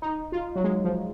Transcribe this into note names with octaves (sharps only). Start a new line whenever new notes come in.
D#4
F4
F#3
G#3
F3